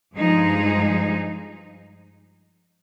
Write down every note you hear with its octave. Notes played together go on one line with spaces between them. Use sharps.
G2 F3 G#3 D#4 G#4